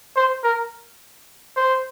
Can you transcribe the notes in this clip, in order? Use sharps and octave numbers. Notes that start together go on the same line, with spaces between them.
C5
A#4
C5